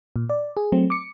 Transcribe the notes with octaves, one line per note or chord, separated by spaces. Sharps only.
A#2
D5
G#4
F#3 A3 C4
D6 C#7